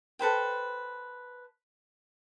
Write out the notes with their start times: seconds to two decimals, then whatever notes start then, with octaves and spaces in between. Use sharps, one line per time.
0.19 A4 B4 C5 G5